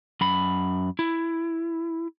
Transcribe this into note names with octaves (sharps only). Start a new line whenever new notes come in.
F#2 B5
E4